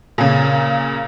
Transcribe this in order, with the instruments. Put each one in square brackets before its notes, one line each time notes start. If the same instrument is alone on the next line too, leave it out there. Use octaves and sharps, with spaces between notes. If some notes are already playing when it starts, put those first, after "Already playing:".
[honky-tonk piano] A#2 C#3